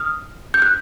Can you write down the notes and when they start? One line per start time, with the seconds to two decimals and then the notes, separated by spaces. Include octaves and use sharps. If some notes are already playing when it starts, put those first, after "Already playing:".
Already playing: D#6 F6
0.54 G6
0.62 F#6